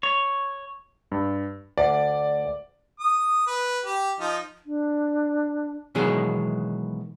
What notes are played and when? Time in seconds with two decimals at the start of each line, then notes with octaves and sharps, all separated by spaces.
0.03 C#5
1.12 G2
1.78 D2 D5
3.00 D#6
3.47 B4
3.85 G4
4.20 F3 D#4
4.66 D4
5.95 B2 D#3 E3 F#3 G#3 G#4